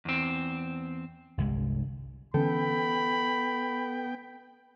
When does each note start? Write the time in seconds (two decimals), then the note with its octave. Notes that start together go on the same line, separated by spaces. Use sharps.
0.05 E2 C4
1.38 G1 C2 G#3
2.34 D3 E3 B3 C#4 A4 G5 B5